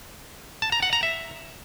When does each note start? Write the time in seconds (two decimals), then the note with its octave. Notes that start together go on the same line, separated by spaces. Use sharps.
0.62 A5
0.72 A#5
0.83 F#5
0.93 A#5
1.03 E5